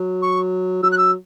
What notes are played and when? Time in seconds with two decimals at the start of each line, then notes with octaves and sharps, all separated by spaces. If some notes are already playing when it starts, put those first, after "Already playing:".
Already playing: F#3
0.22 C#6
0.83 F#3 E6
0.92 F#6
0.98 E6